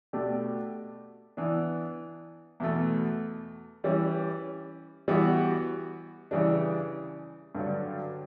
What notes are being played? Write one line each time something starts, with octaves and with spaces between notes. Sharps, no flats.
B2 A3 D4 G4
E3 B3 D4
E2 B2 A3
E3 G3 C#4
E3 G3 B3 F#4
C#3 E3 G3 D4
G2 D3 F#3